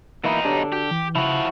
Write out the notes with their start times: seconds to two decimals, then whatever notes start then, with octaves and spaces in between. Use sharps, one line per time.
0.24 B2 E3 A#3 D#4 E4
0.45 D3 D4 G4 C#5
0.72 F#4 G4
0.91 E3
1.15 C#3 F3 E4 F#4